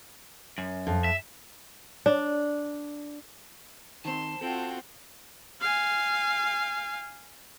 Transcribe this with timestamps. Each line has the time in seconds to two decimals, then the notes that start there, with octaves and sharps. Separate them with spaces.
0.58 F#2
0.87 F2
1.04 E5
2.06 D4
4.05 D#3 C4 C5 A5 C6
4.41 C4 F4 F#4 A4 G5
5.61 F5 G#5